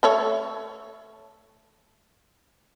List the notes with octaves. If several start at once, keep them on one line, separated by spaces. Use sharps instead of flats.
A3 A4 C#5